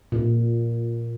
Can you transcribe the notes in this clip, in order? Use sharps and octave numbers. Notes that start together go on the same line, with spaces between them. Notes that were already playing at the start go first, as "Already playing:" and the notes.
A#2